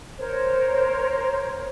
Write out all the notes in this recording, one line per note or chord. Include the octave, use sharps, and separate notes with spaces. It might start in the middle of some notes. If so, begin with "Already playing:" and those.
A#4 C5 C#5